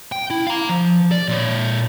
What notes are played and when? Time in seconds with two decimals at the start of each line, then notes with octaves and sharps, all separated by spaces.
0.12 G5
0.30 E4
0.47 F5 A#5
0.69 F3
1.11 D5
1.28 A#2 C#5